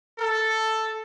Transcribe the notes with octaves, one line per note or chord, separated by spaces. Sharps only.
A4